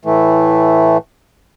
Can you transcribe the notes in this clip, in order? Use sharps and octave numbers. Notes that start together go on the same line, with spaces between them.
A2 E3 A3